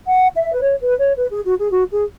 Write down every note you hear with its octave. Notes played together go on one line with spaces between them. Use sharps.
F#5
E5
B4
C#5
B4
C#5
B4
G#4
F#4
G#4
F#4
G#4